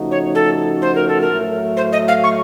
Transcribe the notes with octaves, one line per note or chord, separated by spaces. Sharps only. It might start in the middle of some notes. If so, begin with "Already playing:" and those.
Already playing: C#3 F3 A3 D#4 F#4
C#5
A4
C5
A#4
A4
A#4
A2 F#3 A3
C5
D#5
F5
C#6